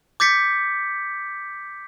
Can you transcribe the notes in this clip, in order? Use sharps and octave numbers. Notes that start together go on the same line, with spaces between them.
D6 G6 A6 B6 C#7